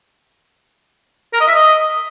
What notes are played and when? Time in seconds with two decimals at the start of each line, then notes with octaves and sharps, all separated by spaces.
1.33 A#4
1.41 D#5
1.48 E5
1.55 D#5